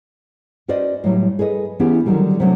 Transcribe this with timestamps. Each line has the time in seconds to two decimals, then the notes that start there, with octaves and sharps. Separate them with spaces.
0.68 C#4 F#4 B4 C5 D5 D#5
1.04 A2 F#3 G3
1.39 G#4 A4 B4 D#5
1.79 E3 B3 C#4 E4 G4 G#4
2.05 D3 D#3 F#3 G3 A#3
2.40 C3 F#3 A3 D4